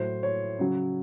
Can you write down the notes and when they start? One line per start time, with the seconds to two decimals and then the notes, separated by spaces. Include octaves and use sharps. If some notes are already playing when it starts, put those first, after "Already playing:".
Already playing: A2 F#3 C5
0.23 C#5
0.59 C#3 F#3